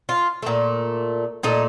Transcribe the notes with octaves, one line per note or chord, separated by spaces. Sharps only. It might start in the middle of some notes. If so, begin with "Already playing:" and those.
F4
A#2 A3
A#2 A3 D#4